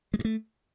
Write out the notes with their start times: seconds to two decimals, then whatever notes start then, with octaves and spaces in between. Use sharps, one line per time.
0.14 G#3
0.19 G2
0.25 A3